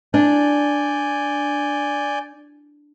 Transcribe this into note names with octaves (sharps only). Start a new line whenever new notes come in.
D4 D5 G#5 G6